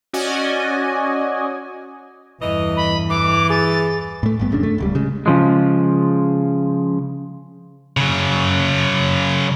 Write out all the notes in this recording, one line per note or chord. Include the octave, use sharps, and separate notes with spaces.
C#4 F#4 D5 D#5 G#5
G1 E2 E3 D#5
B5
E3 D6
G#4 A6
A2 A3
G#1 G2 B3
D#1 F#2 C#3 D4
A3
D1 C#2 G3
C#3 G#3
C#3 F3 G#3
C#3 F#3